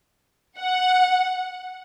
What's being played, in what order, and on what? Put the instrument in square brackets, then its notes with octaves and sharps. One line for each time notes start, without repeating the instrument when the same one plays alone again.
[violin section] F#5